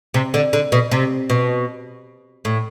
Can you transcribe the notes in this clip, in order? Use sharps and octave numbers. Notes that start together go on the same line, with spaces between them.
C3
D3
D3
B2
C3
B2
A2